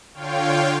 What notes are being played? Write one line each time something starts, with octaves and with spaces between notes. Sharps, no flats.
D3 F4 C#5 F5 G5